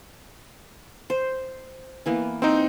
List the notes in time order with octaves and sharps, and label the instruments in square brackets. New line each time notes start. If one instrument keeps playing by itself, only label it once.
[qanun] C5
E3 A#3 B3
[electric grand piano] C4 D#4 [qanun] C5 F#5 G5